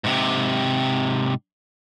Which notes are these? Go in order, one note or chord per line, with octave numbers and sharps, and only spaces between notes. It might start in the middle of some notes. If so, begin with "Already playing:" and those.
G#2 C3